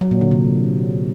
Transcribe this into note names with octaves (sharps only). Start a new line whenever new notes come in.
F#3
A#2
D3
C3